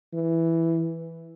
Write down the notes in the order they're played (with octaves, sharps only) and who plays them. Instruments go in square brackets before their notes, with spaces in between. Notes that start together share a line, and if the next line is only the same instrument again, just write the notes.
[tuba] E3